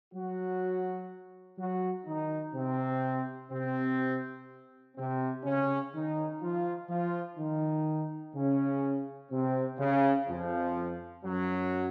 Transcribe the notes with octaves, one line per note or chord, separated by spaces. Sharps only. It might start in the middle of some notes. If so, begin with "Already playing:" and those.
F#3 F#4
F#3 F#4
D#3 D#4
C3 C4
C3 C4
C3 C4
C#3 C#4
D#3 D#4
F3 F4
F3 F4
D#3 D#4
C#3 C#4
C3 C4
C#3
F2 F3
F#2 F#3